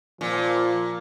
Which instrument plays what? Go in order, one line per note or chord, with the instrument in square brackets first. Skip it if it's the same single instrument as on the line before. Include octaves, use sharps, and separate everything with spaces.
[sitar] A#2 [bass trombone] F3